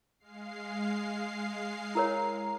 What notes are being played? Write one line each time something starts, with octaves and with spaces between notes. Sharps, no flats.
G#3 F5 C7
E4 A#4 C#5 A#5